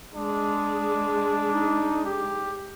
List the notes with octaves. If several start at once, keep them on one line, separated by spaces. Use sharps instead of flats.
G#3 D4
D#4
G4